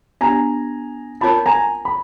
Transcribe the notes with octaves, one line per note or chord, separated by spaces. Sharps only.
B3 D4 G4 G#5 A#5
C4 F4 A#4 C#5 A5 B5
G#5 A#5
B5